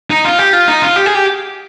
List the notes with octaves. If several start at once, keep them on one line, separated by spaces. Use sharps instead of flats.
D#4
F4
G4
F4
D#4
F4
G4
G#4
G4